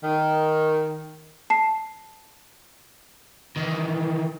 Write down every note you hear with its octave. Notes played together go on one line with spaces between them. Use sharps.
D#3
A5 C7
D#3 E3